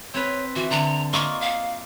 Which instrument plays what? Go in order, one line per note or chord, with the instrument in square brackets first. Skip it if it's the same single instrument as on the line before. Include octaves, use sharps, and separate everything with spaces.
[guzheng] C4 B4 [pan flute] C#5
[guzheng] E3 [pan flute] F#4
[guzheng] D3 [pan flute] A#5
[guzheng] A#3 F4 D#5 [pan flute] C#6
[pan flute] F5